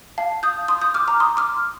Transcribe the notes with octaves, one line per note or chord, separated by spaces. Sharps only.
F5 A5
D#6 G6
C6 D#6
D#6 G6
D6 F6
A#5 D6
C6 D#6
D6 F6